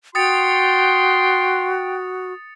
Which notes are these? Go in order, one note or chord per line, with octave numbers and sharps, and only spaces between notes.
F#4 G5 C6 D#6 A6 C#7